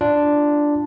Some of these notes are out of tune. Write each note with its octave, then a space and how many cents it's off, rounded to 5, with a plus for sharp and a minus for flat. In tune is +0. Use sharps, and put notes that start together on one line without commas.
D4 +0 F4 -15